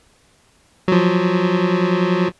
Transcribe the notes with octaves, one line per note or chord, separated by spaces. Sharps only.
F3 F#3